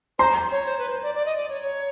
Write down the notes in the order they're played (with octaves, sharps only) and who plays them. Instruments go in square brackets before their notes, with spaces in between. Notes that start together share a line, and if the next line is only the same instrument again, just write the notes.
[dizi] C5 [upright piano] A#5 C6
[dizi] C#5
C5
B4
C5
D5
D5
D#5
D5
C#5
C#5